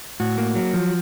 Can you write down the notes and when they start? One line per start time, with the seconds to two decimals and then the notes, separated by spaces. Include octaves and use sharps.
0.20 A2 F#4
0.38 A#3
0.55 F#3
0.74 F3